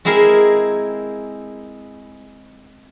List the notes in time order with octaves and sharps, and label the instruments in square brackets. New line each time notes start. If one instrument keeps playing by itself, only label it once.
[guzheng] G#3 C4 E4 G#4 A#4